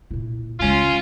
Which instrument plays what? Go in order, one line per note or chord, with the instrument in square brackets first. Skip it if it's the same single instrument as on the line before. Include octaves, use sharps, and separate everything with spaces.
[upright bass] A#2 E4
[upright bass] C#2 G#3 [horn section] C#4 F4